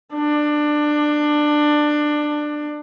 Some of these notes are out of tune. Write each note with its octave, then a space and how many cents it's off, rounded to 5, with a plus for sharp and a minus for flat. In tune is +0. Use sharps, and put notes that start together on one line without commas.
D4 +20